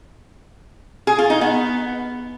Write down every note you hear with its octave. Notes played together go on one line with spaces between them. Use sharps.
G#4
F4
D#4
B3